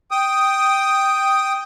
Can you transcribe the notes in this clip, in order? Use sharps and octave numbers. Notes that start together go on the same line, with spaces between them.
G5 D#6